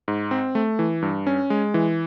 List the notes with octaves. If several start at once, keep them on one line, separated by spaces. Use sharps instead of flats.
G#2
C4
A3
E3
G2
C#4
G#3
E3